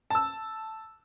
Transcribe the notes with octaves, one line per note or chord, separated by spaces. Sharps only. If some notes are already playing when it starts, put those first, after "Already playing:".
A5 E6